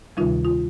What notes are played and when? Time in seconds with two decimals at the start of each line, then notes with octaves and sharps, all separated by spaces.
0.17 D2 C3 D#3 G3 D#4 F4
0.45 F4